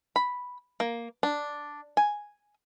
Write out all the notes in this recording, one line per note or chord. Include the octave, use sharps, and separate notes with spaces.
B5
A#3
D4
G#5